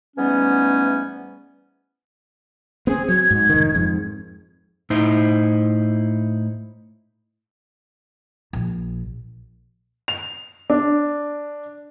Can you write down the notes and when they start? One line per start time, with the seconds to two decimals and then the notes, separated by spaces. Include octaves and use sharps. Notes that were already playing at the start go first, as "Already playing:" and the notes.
0.17 G#2 E3 G3 A3 B3 C#4
2.87 B3 C4 G#4
3.08 F#3 G#6
3.31 G#2
3.49 F1 D#3
3.75 F2 G#2
4.90 A2 D#4 E4 C5
8.53 A#1
10.08 F7
10.70 D4